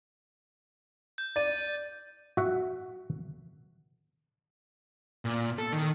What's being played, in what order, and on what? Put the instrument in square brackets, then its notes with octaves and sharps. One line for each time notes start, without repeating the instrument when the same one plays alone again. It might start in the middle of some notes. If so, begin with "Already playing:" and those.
[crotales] G6
[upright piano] D5 [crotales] A6 D#7
[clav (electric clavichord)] F#4 E5 F#5
[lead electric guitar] A#2
A4
D#3